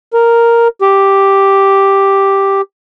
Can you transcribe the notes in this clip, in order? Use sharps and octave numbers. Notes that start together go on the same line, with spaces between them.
A#4
G4